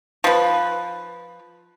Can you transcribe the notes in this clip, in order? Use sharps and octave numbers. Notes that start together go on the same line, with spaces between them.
F3 B4